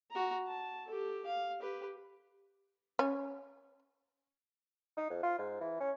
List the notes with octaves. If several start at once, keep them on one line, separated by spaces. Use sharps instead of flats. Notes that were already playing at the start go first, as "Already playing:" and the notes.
F#4 A#5
A5
G4 A4
F5
G4 B4
C#4
D#4
F2
F4
G#2
E3
C#4